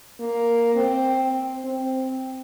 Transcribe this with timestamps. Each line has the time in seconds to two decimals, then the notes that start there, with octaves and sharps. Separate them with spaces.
0.20 A#3
0.76 C4
1.64 C4